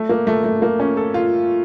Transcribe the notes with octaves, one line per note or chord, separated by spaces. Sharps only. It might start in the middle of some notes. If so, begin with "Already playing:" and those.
Already playing: A3
A#3
A3
A3
A#3
C#4
A4
F4